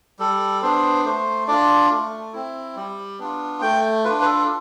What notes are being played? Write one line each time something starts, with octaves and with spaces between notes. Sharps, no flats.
G3 A4
B3 D4 C5
A3 C5
D4 F4 D5
A3
C4 E4
G3
B3 D4 F4
A3 G5
D4 F4 B4
B4
A4